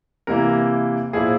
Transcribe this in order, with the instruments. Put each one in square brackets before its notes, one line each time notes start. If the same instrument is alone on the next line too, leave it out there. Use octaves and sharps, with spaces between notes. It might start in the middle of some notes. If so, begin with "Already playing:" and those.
[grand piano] C3 E3 A#3 E4 A#4
A#2 F3 A#3 E4 G#4